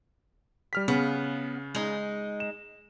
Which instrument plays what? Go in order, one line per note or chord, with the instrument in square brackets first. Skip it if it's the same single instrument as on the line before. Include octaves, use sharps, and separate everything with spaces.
[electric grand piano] G3 F6 B6
[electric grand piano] C#3 [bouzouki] B3
[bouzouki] G#3 D#4
[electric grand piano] E7